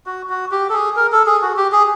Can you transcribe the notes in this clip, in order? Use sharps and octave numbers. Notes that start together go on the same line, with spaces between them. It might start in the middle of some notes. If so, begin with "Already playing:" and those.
F#4
F#4
G4
A4
G#4
A#4
A4
G#4
F#4
G4
G#4